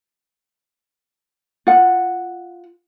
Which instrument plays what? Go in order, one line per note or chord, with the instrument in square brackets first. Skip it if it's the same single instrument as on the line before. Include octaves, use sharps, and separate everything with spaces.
[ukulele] F4 F#5